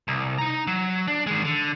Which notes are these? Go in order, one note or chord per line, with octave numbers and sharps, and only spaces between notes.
C2
D#4 A#5
F#3
D4
D#3 G#3
D3